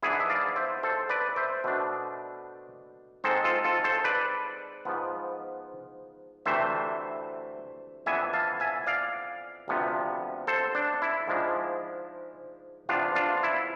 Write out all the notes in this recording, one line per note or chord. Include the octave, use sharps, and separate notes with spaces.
G#2 E3 B3 D4 E4 G#4
E5
D5 F5
C5 E5
A4 C5
B4 D5
C5 E5
B2 A3 D4
G#2 G#3 C4 A4 C5
F4 A4
F4 A4
A4 C5
B4 D5
G#2 F3 B3
D2 C3 E3 A3 C4 C5 E5
F2 E3 B3 D4 E5 G#5
F5 A5
E5 G#5
D5 F5
D2 C3 F3 B3
A4 C5
D4
E4
G#2 F3 G#3 D4
E2 C3 F3 B3 D4 F4
D4 F4
E4